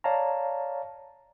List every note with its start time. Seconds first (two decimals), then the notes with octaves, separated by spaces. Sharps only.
0.04 C#5 D5 F5 A5 A#5